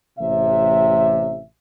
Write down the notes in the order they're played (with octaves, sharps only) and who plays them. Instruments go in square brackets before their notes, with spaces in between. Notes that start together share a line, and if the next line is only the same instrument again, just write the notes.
[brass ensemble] A1 C3 E5